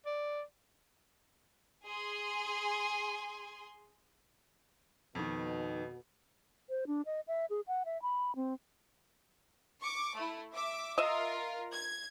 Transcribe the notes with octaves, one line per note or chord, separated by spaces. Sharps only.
D5
G#4 G#5 C6
F2 B2 D#3
C5
D4
D#5
E5
G#4
F#5
E5
B5
C4
C#6 D6
A3 E4
E5 D6
F4 A#4 D#5 E5
G#6